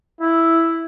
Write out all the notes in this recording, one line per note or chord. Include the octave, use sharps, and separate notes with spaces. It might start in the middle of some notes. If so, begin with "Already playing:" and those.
E4